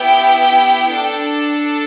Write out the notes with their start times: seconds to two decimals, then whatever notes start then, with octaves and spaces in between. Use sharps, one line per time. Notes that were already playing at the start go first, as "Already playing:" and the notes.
Already playing: B3 E4 G4 G5
0.88 D4 A4